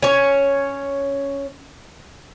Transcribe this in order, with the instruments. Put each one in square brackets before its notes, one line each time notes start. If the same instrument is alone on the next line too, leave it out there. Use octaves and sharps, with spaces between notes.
[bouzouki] C#4 C#5